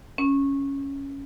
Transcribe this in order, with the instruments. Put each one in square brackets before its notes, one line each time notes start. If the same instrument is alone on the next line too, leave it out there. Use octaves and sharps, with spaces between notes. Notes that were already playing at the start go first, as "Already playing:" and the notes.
[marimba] C#4